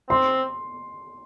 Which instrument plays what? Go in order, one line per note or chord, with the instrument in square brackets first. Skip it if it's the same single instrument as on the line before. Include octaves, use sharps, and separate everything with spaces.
[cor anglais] C4 [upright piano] C6